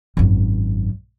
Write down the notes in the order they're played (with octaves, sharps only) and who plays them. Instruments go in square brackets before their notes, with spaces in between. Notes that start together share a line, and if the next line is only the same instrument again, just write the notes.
[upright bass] G#1 F#2